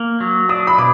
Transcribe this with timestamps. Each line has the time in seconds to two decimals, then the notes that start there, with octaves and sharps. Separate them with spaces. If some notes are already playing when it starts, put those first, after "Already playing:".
Already playing: A#3
0.20 F#3
0.49 D4 D#6
0.67 B5
0.78 B2 D6